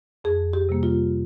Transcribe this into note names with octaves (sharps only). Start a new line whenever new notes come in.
F2 G#4
G4
C3 G3 A#3
F4